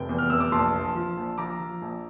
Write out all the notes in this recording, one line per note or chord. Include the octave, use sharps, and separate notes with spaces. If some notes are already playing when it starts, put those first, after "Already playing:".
Already playing: F1 G5
E2
F6
F1 E6
D6
A#1 A5 C6
F3
F3
A#1
F3 A#5 D6
F3
A#1